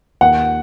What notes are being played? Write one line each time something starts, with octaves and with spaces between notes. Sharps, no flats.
D#2 F#5